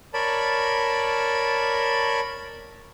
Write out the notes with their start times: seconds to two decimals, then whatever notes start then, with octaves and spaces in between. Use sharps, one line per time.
0.14 A#4 C#5 D5 A5 B5